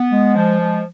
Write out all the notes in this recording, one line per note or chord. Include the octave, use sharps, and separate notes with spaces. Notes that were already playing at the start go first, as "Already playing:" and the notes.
Already playing: B3
G#3
F3
G#3